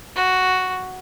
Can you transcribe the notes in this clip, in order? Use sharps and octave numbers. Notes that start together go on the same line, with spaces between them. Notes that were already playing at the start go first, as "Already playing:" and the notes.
F#4